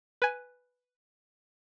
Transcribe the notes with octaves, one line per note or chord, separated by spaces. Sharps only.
B4 G#5